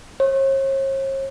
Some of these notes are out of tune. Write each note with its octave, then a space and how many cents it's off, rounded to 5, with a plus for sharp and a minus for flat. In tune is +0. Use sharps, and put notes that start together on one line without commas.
C#5 -45